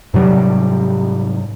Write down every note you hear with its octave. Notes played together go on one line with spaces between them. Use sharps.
G#2 C3 F#3 G3